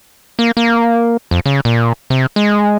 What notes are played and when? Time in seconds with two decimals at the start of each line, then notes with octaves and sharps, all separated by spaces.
0.39 A#3
0.57 A#3
1.31 F2
1.46 C#3
1.65 A#2
2.10 C3
2.36 G#3